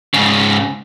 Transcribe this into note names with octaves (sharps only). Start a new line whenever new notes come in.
G#2 C#3